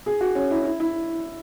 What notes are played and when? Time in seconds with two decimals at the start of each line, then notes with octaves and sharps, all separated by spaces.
0.06 G#4
0.21 F#4
0.35 C#4
0.51 E4
0.65 E4
0.80 E4